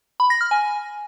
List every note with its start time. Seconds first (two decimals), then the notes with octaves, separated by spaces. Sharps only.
0.20 B5
0.30 A#6
0.41 F6
0.51 G#5